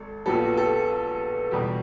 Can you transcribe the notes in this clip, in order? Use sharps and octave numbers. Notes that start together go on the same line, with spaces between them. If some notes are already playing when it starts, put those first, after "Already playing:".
Already playing: G#1 A4
A#1 A#2 F#3 B3 G4 A4
G4 A4
E2 B2 G3 G4